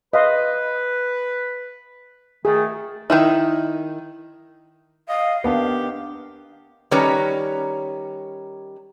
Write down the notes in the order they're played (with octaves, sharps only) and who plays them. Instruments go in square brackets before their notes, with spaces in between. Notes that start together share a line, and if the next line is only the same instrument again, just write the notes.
[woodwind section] B4 [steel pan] D#5 F5 C6
[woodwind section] D#3 A3 [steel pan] G#4
[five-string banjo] D#3 D#4 E4
[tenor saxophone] D#5 [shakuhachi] F5
[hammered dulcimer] D#3 D4 A#4 [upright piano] B3 [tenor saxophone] G4
[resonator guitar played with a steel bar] D#3 G3 C#4 B4 C#5 A#5